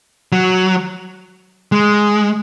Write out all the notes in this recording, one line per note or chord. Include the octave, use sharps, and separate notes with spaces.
F#3
G#3